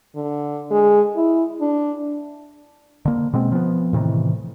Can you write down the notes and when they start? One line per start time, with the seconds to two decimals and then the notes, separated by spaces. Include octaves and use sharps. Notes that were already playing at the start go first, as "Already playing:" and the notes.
0.16 D3
0.71 G#3
1.16 E4
1.61 D4
3.05 D3 A#3
3.33 B2 G#3 C4
3.52 F3 B3
3.93 A2 C3 D#3 E3